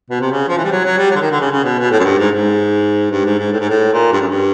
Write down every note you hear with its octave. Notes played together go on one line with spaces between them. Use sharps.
B2
C3
C#3
F3
E3
G3
F#3
F#3
G3
F#3
D3
D#3
D3
C#3
C#3
B2
B2
A2
F#2
G2
G#2
G#2
G2
G#2
G#2
A2
G#2
A2
A#2
G2
F#2
G2